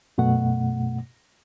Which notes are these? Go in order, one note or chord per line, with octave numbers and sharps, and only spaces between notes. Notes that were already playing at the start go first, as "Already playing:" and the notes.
F#2 B2 A3 F#5